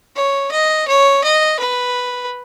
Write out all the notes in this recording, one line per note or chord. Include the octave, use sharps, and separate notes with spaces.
C#5
D#5
C#5
D#5
B4